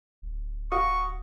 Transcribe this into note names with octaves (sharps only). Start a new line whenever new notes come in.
D1
F#4 F5 C#6 D#6